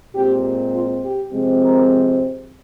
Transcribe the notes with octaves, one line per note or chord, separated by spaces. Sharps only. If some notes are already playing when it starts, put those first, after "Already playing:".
A#2 G#3 C4 G4
F4
G4
C3 F3 G#3 C4
A#4